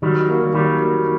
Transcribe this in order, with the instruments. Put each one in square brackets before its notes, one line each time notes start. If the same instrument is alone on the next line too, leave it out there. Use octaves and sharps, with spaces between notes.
[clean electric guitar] D#3 G3 [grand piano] F#3
[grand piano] A#3 F#4 A#4
[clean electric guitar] D#3 G3 [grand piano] F#3
[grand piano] A#3 F#4 A#4